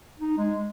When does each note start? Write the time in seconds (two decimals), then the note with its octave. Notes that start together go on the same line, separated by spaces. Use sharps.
0.19 D#4
0.38 G#3